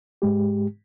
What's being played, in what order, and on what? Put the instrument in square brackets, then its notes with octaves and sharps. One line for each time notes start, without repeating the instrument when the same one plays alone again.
[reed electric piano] G#2 G#3 G4